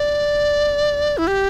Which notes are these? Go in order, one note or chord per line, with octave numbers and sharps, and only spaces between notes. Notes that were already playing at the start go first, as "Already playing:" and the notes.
Already playing: D5
E4
G4